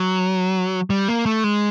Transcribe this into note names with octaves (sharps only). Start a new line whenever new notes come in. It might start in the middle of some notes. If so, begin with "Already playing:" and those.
Already playing: F#3
G3
A#3
A3
G#3